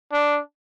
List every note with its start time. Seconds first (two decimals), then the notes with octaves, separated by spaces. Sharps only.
0.12 D4